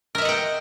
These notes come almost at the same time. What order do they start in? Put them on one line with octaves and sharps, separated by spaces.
A#4 E5 D#5 F#5 G5